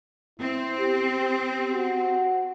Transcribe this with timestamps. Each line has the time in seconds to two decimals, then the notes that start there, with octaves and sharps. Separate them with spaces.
0.39 C4 E4
0.79 G4
1.19 G4
1.74 F#4